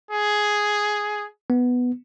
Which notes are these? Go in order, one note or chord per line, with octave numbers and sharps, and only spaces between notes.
G#4
B3